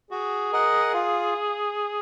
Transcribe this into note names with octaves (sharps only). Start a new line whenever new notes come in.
F#4 G#4
A#4 D#5 F#5
F4